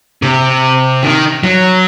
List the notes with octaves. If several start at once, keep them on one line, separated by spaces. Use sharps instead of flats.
C3
D#3
F#3